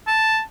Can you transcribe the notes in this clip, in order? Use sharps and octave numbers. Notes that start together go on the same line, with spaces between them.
A5